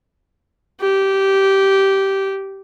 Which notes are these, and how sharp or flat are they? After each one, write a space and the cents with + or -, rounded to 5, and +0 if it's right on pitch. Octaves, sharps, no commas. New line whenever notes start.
G4 -15